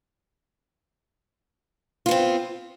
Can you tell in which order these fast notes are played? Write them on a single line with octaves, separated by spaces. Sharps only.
F4 B3 C4